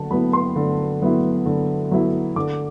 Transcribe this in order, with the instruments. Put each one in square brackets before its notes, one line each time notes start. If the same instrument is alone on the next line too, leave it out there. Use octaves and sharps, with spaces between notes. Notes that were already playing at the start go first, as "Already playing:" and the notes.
Already playing: [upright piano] D3 F#3 F#5 A5
F#3 B3 E4 B5
C6
D3
F#3 B3 E4
D3
F#3 B3 E4
D3 D6